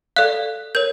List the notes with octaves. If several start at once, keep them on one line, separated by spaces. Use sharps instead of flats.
A4 D5 F5 F#6
A#4 C#5 G6